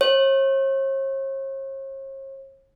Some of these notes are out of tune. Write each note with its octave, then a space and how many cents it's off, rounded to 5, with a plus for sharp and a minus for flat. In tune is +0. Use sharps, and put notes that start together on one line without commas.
C#5 -45